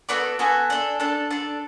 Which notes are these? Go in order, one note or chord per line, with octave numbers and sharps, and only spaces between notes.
B3 F#4 A4 D5
B3 F#4 A4 G#5
D4 A4
D4 A4 A5
D4 A4 A5